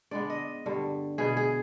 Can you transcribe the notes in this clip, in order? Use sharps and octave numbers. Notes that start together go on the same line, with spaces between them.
D3 G#3 B3 D5
D#5
G2 D3 G3
B2 B3 G#4
G#4